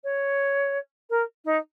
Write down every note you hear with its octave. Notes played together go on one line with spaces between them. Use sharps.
C#5
A#4
D#4